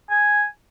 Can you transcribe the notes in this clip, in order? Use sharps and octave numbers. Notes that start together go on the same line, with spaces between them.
G#5